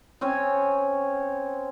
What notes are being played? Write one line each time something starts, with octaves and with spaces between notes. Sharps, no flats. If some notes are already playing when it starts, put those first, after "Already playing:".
C4 C#4 C#5 G#5